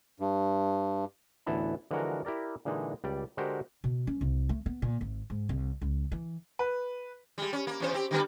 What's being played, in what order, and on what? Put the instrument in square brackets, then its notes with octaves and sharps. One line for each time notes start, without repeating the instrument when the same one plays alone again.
[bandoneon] G2
[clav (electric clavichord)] A1 D2 E3 B3 E4 A5
D3 E3 F3 G#3 F#4 A#4
E4 G4 A#4 D5
A#2 D3 E3 G#3 D#4
C#2 G3 D5
D3 G#3 F#4 G4 A#4 C5
[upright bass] B2
C#4
C2
A3
B3
A#2
G#1
G#2
C2
C#2
E3
[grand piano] B4
[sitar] G3 G#3
C#4
A#3
E2 C#4 C5
C4 G4
D3 G3 B3